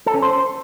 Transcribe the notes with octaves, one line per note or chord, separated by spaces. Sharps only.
A4
C#4
C5